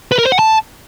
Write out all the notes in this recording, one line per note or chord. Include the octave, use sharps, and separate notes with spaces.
B4
A#4
C5
F#5
A5